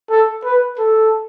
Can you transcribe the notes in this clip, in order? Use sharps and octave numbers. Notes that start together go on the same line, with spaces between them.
A4
B4
A4